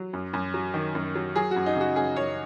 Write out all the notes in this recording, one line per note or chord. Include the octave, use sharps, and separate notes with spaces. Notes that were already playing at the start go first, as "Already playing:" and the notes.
Already playing: F#3
F#2
F#2
F#3
D#3
F#2
F#3
F#3 G#4
F#4
F#2
D#4
C#3 F#4
F#2 G#4
F#2 C#5